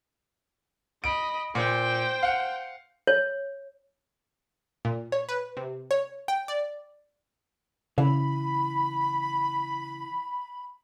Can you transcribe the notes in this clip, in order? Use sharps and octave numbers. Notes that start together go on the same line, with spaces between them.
D#5 B5 D7
A#2 C5 G5
F5 F#5
C#5
A#2
C#5
B4
C3
C#5
G5
D5
C#3 E3 B5